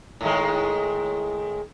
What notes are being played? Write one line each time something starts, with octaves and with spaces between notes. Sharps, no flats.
A2 D#3 G#3